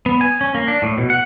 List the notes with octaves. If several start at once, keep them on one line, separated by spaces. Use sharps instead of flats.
B3
G#5
C#4
A#3
D4
A2
B2
F#5